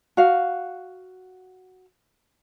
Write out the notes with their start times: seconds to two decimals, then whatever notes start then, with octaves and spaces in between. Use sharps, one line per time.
0.17 F#4 F5